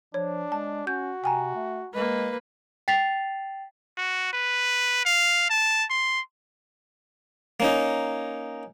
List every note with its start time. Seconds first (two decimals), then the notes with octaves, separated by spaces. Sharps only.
0.14 F3 D4 C#5
0.52 G#3 A5
0.87 C#4 F#4 G6
1.24 C3 G5 G#5 A#5
1.55 A3
1.94 G#3 A#3 B4
2.88 G5 A6 B6 C7 F7
3.97 F#4
4.33 B4
5.05 F5
5.50 A5
5.90 C6
7.60 A#3 C#4 D#4